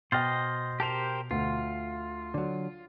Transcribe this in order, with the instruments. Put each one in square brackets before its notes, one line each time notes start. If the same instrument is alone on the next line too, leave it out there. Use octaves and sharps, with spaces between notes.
[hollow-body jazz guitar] B2 [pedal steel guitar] C5 D#5 [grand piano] G5 F6 A6
[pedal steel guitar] G4 A#4 C5 [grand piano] A5 F7
[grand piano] D2 [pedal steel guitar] F4
[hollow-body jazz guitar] D3 F#3